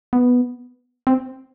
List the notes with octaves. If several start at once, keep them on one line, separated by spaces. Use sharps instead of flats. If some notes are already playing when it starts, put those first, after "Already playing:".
B3
C4